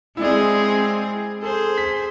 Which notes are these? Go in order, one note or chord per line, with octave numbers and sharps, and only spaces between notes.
G#3 C4 E4 G#4 D5
G#4 A4 C5
B6